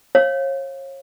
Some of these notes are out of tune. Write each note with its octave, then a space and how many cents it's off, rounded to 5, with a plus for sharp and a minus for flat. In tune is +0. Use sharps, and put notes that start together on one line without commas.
C#5 -35 F5 +0